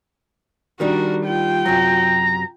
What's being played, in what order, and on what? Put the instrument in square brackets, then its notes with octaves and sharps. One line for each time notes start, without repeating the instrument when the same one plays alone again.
[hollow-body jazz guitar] D#3 G3 D4 [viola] F#4 A#4
[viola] F4 G5
[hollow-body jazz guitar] F#2 C3 F#3 [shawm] A#5